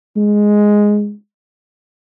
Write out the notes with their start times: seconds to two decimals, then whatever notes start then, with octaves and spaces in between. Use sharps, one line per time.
0.16 G#3